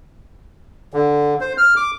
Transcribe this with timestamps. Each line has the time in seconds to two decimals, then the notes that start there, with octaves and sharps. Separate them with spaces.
0.94 D3
1.41 C5
1.58 F6
1.76 D6